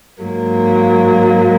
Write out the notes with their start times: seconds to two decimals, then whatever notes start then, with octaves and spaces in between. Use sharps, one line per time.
0.23 G#2 F#3 A#3